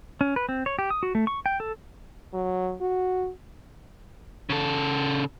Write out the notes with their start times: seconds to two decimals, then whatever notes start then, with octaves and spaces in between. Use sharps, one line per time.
0.21 C#4
0.36 B4
0.49 C4
0.66 C#5
0.79 G4
0.90 D#6
1.03 F#4
1.15 A3
1.27 C#6
1.46 G5
1.60 A4
2.33 F#3
2.81 F#4
4.50 C#3 A4